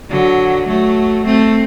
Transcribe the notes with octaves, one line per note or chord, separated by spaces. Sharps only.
D3 F#3
F#3 A3
A3 C4